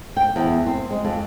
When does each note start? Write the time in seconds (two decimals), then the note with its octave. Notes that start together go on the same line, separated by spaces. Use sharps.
0.17 G5
0.36 E2
0.67 C4
0.91 G#3
1.05 F2